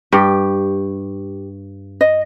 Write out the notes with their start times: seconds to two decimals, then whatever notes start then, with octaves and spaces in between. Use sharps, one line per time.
0.13 G2 G4
2.01 D#5